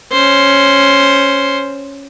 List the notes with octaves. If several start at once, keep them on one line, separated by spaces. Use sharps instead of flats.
C#4 C5